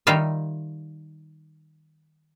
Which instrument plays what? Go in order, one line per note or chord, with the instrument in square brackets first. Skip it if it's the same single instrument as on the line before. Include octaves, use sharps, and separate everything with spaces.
[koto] D#3 G3 D#4 F4 E5